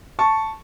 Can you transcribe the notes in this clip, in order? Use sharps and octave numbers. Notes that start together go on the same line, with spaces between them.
A5 C#6